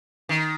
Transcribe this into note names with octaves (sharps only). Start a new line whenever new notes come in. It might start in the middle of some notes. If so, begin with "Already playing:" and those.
D#3